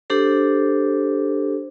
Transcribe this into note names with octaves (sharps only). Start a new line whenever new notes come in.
D4 G4 A4 C5